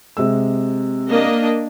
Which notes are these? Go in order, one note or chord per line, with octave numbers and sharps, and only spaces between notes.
C3 G#3 E6
A#3 D4 D#5